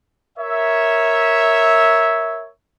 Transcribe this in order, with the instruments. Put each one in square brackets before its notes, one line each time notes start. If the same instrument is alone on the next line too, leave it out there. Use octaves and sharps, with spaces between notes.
[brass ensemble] A#4 C#5 E5